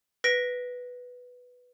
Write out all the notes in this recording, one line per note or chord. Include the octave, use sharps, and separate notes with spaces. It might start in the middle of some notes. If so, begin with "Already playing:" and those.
B4 A#6 B6 D7